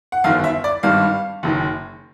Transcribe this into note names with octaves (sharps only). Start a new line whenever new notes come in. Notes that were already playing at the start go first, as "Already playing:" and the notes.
F#5
G1 F#2 D#3 F5
E5
D5
G#1 G2 D#3 G3 F5
F#1 F#2 D#3